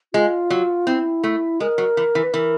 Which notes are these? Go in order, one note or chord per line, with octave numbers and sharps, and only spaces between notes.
G#3 F4
F#3
C4 E4
A3
G#3 A#4
F#3
E3
E3
B4
E3 A#4